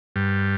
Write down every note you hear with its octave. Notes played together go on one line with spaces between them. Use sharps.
G2